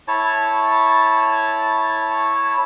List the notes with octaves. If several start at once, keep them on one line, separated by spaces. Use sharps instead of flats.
E4 C#5 A5